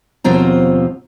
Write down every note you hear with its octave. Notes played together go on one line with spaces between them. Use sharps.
D#2 B2 F3 C4 A#5